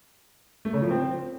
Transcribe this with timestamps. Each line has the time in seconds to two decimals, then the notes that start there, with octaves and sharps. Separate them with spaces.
0.65 A3
0.74 C#3
0.82 F3
0.91 C4